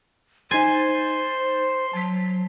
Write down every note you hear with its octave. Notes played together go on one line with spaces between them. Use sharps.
D#4 C5 G#5 C6 A6
F#3 A5 B6